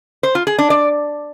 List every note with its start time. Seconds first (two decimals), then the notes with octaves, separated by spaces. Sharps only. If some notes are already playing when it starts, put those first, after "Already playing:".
0.23 C5
0.35 F4
0.47 G#4
0.58 D4
0.70 D5